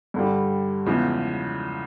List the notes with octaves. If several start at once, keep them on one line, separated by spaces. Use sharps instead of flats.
G2 D3 G3
E2 C#3 F3 G#3